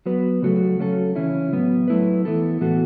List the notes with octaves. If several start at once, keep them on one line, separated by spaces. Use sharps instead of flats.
F#3 B3 F#4 B4
C#3 F#3 A3 F#4 A4
C#3 F#3 C#4 A4
C#3 E3 C#4 E4
A2 F#3 B3
F#3 A3 E4 B4
E3 B3 E4 A4
A2 E3 B3 F#4 A4